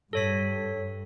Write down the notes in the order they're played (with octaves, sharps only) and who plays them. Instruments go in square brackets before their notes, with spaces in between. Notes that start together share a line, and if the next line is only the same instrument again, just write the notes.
[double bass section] G2 [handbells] A4 C#5 B6